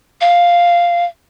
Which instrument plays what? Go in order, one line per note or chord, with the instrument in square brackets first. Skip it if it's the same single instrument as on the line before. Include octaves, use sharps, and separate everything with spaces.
[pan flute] F5